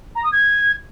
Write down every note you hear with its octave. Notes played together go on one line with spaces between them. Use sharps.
A#5
D#6
G#6